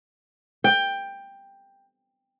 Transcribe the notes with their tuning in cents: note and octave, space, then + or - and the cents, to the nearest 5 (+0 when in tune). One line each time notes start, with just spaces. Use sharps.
G5 +10